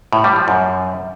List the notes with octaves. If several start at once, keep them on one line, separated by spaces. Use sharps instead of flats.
A2
G3
F3
F#2